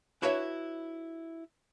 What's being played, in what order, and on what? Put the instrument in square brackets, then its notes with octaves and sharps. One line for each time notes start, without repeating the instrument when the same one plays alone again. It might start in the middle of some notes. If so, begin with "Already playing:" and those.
[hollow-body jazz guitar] D4 E4 F#4 B4 C#5 E5